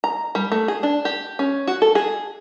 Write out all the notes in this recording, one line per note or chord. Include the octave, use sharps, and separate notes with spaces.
A#5
G3
A3
G#4
D4
G4
C#4
F#4
A4
G#4